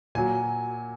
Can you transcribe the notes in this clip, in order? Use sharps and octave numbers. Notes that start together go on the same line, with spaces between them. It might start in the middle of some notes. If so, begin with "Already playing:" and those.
A#2 F#3 G#5